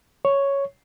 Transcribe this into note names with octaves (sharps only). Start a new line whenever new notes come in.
C#5